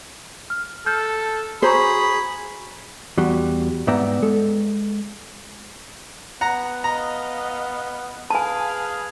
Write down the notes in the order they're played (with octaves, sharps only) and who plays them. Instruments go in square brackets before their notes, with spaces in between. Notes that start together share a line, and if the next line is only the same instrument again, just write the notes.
[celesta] F6
[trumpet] A4 [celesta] F6 G6
[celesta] F#4 A#5 C#6 [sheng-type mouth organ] G#4 [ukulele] C5 [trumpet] B5
[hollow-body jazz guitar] E2 G3 F#4 C6
G#2 B3 D5 E5 G5 A#5
G#3 A4
[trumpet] B3 [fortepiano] F#5 A#5
[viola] D#5 F5 [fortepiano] A#5
[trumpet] G#4 [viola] B4 F5 [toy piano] G#5 A5